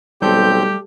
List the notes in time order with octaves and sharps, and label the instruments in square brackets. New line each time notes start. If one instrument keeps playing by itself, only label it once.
[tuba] B1 [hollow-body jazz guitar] G3 A3 A4 [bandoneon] C4 G6 [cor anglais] G4